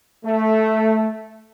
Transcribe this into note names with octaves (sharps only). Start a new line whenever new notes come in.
A3